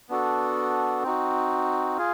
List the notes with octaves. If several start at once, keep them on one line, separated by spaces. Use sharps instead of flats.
B3 D4 F#4 A4
C4 D#4 F#4
F4 G#4